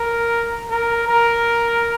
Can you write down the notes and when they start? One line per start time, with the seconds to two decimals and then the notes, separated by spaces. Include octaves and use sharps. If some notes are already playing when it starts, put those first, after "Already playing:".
Already playing: A#4
0.70 A#4
1.08 A#4